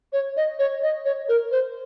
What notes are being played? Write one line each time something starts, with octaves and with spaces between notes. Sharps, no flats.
C#5
D#5
C#5
D#5
C#5
A#4
C5